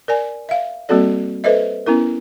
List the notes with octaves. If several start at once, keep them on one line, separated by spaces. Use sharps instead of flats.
A#4 D5 G#5
E5 F5
G3 A#3 C4 F#4 A4 D5
A4 B4 C5 D#5 E5
B3 C#4 E4 A#4